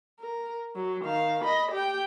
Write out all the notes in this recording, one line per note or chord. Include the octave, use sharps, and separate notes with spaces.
A#4
F#3
D#3 F5
D#5 B5
G4 G5